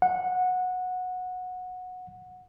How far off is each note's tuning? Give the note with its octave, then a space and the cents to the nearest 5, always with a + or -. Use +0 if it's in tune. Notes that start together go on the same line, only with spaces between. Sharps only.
F#5 -15